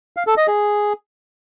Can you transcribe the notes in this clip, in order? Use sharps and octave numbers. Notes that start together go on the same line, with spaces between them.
F5
A4
D#5
G#4